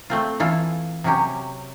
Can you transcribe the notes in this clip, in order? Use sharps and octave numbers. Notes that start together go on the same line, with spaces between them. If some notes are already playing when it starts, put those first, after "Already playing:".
A3 C4 F4
E3 E4 F4 A4
C3 F#3 C#4 G4